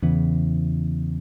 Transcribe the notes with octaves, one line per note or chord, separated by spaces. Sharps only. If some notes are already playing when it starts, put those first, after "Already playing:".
E2 C#3 E3 B3